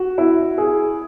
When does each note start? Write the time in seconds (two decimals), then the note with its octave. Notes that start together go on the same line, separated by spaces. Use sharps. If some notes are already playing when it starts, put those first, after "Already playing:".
Already playing: F#4
0.18 E4
0.58 G#4